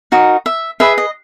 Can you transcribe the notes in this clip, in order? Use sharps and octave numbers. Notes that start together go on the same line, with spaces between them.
D#4 F#4 A#4 D#5
E5
G#4 B4 D#5 E5
D#5